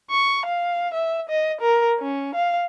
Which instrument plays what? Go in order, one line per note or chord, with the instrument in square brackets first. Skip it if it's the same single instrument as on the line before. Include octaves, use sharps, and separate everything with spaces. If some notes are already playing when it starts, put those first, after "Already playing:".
[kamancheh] C#6
F5
E5
D#5
A#4
C#4
F5